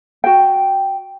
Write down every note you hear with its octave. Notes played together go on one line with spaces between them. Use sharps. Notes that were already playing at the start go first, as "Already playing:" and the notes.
F#4 G5